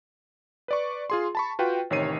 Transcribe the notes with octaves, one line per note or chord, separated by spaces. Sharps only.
B4 D5 C#6
F4 G#4 C6
A5 B5 C#6
F4 F#4 B4 G5
A1 C3 D#3 C#5 C7 D#7